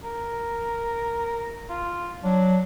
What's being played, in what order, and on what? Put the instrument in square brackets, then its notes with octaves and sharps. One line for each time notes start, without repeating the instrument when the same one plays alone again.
[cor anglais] A#4
F4
[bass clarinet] F#3 [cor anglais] D4